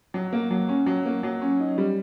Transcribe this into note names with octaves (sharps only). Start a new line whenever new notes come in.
F#3
A#3
F#3
C#4
F#3
A#3
F#3
C#4
D#4
G3